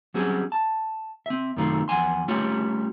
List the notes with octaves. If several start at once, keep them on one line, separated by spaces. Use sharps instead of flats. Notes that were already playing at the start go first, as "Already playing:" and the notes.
F#3 G3 C4 C#4 G#4
A5
C4 E5
F#2 C3 D#3 A3 F4
E2 F3 F#5 G#5 C6
G3 A3 C#4 F4 G4 C#5